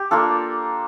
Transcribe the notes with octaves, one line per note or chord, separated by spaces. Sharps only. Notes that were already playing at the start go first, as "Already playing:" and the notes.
Already playing: G4
A#3 D4 F4 A4